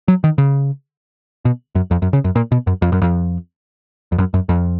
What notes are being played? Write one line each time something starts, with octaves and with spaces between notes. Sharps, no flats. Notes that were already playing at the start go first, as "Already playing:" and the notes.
F#3
D#3
C#3
B2
F#2
F2
F#2
C#3
F#2
A#2
B2
F#2
F2
F#2
F2
F2
F#2
F#2
F2